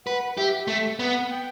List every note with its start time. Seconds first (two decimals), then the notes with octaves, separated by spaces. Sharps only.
0.06 B4 F#5
0.36 G4 E5
0.68 A3 E5
0.99 B3 F#5
1.30 G5